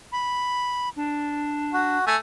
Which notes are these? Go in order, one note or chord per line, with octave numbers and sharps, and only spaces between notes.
B5
D4
F#4
A3 G#5